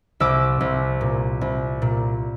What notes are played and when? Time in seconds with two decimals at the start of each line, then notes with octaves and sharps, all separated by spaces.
0.20 C2 D6 E6
0.61 C2
1.01 A#2
1.41 C2
1.82 A#2